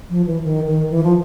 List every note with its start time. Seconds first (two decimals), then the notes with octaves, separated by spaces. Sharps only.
0.09 F3
0.26 E3
0.44 D#3
0.67 D#3
0.90 E3
1.03 F3